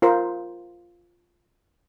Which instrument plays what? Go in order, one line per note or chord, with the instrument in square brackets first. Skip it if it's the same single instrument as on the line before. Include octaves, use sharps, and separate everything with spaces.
[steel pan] F4 A#4 C5